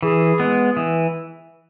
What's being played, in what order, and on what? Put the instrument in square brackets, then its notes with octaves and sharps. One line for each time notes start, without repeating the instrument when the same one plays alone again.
[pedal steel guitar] E3 [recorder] G#4
[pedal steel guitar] G#3 B3
E3